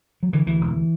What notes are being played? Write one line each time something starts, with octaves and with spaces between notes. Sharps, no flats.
F#3
D3 E3
D2 E3
E1